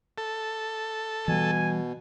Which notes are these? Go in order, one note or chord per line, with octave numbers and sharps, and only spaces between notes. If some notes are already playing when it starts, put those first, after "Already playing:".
A4
B2 E3 G3 G#5